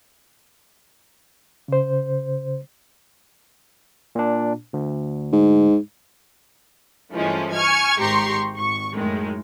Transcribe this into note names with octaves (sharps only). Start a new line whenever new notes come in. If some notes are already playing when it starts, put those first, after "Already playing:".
C#3 C5
A#2 D4
D2
G#2
G2 E3 F3 G#3 A3 C#4
G#5 C#6 F6 G#6
G#1 G#2 G4 A#5 C6 C#6
G#1 C#6
F#2 A2 D#3 G#3